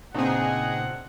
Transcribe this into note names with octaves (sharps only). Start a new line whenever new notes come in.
A#2 C#3 B3 C4 D4 D#4 G#4 F#5